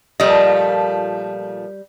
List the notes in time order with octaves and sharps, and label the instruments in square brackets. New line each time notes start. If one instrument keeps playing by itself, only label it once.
[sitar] A#2 F3 A3 [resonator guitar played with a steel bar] G3 D#5